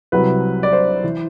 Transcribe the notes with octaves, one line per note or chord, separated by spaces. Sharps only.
C2 C3 F#3 B4
D5
C5
E3